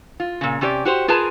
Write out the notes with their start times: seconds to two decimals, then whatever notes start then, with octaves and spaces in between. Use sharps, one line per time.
0.20 F4
0.41 A#2 C#3
0.61 C3 C#4 G4 B4 D5
0.85 F#4 G4 C5
1.08 F4 G#4 A#4 B4 A5